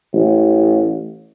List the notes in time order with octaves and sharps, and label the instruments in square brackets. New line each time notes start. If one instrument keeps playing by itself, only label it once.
[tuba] A1